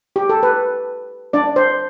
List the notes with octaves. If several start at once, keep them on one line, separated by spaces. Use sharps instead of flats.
G4
A4
B4
D4 D5
C5